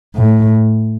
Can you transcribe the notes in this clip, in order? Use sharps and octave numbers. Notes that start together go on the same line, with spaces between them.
A2